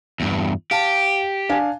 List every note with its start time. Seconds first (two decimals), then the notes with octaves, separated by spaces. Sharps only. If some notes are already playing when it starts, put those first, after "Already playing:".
0.20 E2 G2
0.71 G4 F5 A5
1.49 D4 F5 G#5